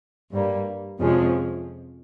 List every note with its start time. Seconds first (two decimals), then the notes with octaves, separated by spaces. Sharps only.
0.31 G2 G3 A#3
1.00 F2 C3 F3 G#3 C#4